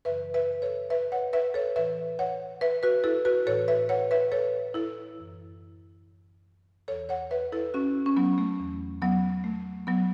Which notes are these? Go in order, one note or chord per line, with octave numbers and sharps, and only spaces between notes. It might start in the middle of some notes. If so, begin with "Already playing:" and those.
F#2 C#3 E3 B4 E5
B4 E5
A4 C#5
B4 E5
C#5 F#5
B4 E5
A4 C#5
A2 E3 B4 E5
C#5 F#5
B4 E5
F#4 B4
E4 A4
F#4 B4
A2 E3 A4 C#5
B4 E5
C#5 F#5
B4 E5
A4 C#5
E4 A4
F#2 E3
E2 E3 A4 C#5
C#5 F#5
B4 E5
E4 A4
C#4 F#4
C#4
F#3 B3
A3
E2 E3
F#3 B3
A3
F#3 B3